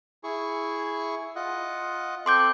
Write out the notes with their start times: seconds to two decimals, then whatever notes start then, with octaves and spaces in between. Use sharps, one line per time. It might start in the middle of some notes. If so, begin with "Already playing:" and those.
0.24 E4 G#4 C#6
1.36 F4 D#5 F#5
2.26 C4 A4 C6 D6 G6